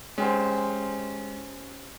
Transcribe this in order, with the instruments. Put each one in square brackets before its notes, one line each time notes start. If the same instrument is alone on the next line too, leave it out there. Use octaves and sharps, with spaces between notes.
[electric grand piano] G#3 [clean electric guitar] C#4 G4 C5